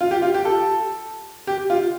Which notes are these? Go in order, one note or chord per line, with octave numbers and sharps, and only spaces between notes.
F4
G4
F4
G4
A4
G4
F4